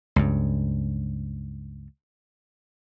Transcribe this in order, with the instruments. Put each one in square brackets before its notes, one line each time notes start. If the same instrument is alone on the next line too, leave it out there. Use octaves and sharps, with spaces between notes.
[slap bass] C#2 G2